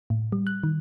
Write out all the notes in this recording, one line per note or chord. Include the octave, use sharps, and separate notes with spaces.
A2
G3
F#6
D#3